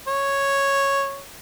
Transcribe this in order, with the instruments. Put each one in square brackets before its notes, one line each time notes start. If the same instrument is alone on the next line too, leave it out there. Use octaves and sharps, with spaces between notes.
[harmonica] C#5